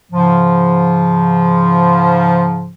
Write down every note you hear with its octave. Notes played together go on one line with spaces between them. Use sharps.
G#2 C#3 F3